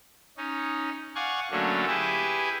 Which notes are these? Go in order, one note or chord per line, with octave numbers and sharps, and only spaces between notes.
C#4 D#4
D5 F5 F#5 G#5 C#6
D3 F#3 A3 A#3 C#4 D4
E4 G4 G#4 B4 E5